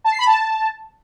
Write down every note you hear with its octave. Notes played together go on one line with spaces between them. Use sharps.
A5
C7
B5
A5